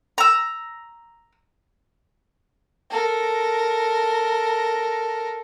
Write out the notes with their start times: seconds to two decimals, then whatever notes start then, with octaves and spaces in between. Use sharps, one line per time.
0.18 A#5 E6
2.91 A4 A#4